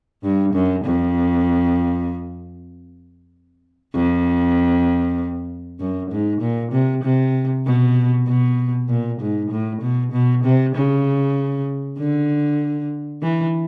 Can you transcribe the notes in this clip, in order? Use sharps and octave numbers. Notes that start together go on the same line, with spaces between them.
G2
F#2
F2
F2
F#2
G#2
A#2
C3
C3
B2
B2
A#2
G#2
A2
B2
B2
C3
C#3
D3
E3